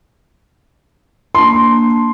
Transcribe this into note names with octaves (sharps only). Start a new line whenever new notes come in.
A#3 D4 A5 C6